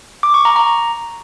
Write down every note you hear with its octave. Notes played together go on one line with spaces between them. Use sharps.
D6
C#6
A#5
A#5